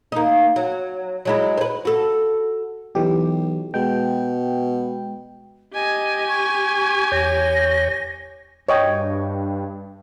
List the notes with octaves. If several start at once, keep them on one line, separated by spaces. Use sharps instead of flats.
A#3 D#4
F#3
F#3 G#3 E4
B4 C5
F#4 A4
B1 E3 G4
B2 G#3 G5
G4 D#5 G#5
C#6
E2 C#5 G6 A#6
G2 C#5 D#5 G5